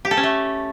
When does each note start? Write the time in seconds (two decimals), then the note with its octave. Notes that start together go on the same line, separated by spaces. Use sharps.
0.05 G4
0.11 A4
0.17 C#4
0.23 A3